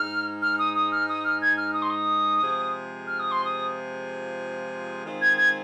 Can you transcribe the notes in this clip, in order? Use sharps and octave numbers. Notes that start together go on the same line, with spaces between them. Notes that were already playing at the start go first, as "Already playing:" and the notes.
Already playing: G#2 G#3 D#4 F6
F6
D#6
D#6
F6
D#6
F6
G#6
F6
D#6
C6
D#6
C3 F3 G#3 F4 G#4
F6
D#6
C6
D#6
D#3 G#3 C4 F4
G#6
G#6